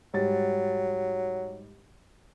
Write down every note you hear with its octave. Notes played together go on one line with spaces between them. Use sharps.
G#2 F#3 G3 A6